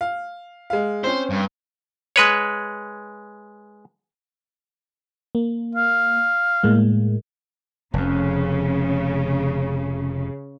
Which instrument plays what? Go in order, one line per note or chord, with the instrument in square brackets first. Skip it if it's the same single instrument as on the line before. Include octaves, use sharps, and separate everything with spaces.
[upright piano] F5
G#3 F5
[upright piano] C4 C#4 [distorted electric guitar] C5
[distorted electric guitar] G2
[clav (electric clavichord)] G#3 B4 C#5
[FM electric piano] A#3
[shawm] F5
[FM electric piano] A2 G#3 A#3
[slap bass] F1 F2 [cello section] C#3